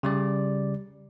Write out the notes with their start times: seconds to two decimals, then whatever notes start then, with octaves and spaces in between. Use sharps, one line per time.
0.03 C#3 G3 D5